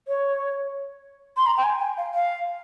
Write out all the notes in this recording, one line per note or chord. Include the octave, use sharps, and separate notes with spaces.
C#5
C6
A#5
G5
G#5
G5
F5
F5